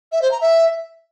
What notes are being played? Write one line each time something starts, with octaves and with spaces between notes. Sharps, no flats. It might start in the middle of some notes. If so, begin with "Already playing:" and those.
E5
C5
A#5
E5